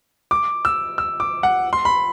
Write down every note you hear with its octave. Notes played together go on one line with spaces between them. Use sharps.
D6
E6
E6
D6
F#5
C6
B5